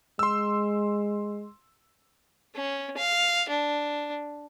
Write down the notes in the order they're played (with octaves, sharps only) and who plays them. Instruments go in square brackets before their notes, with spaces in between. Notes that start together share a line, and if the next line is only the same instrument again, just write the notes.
[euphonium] G#3 [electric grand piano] C6 E6
[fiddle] C#4
F5
D4